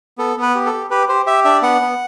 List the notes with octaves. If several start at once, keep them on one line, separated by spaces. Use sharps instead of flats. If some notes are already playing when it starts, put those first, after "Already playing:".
B3 A4
B3
B4
G4
A4
G4
G4 B4
G4 C5
G4 E5
D4 E5
B3 F#5
B3